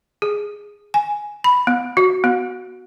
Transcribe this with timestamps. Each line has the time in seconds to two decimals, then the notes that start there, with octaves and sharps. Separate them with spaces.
0.22 G#4
0.94 G#5
1.44 B5
1.67 B3
1.97 F#4
2.24 B3